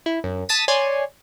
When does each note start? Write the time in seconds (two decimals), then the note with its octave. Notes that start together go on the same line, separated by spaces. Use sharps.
0.06 E4
0.24 F#2
0.49 A5 D#6 A6 B6 D#7
0.68 C#5 D5 G#5 C6